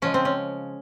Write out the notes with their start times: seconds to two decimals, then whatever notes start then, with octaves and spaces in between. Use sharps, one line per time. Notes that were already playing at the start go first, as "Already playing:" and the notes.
0.02 C#3 F3 G#3 C#4
0.14 C4
0.25 C#4